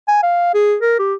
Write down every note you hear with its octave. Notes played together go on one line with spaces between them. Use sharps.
G#5
F5
G#4
A#4
G4